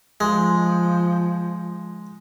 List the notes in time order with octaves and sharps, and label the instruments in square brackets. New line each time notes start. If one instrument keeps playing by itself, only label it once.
[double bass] F3 [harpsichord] G#3